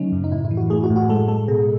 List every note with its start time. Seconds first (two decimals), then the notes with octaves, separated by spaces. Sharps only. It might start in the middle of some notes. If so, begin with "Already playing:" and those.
Already playing: C#3 F#3 A3 C#4 D#4
0.12 F#2
0.24 D#4
0.32 A2 E4
0.45 E4
0.51 E3
0.57 F#4
0.70 A3 G#4
0.84 F#4
0.90 A2
0.96 F#4
1.09 G#3 A4
1.28 G#3 A4
1.48 B2 G#4